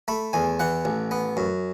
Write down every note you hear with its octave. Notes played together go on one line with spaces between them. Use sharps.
A3 B5
E2 G#5
E3 F#5
A1
B3
F#2